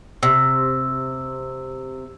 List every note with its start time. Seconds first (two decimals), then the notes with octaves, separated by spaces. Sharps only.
0.23 C3 E6